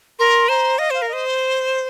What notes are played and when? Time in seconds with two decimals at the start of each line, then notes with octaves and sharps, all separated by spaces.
0.19 A#4 C6
0.49 C5 A#5
0.79 D#5 F5
0.91 C5 F5
1.02 A#4
1.09 C5 D#5